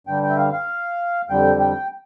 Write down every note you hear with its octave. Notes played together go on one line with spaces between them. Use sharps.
G2 D3 G3 G5
G5
E5
F5
F5
F2 D3 G3 G5
G5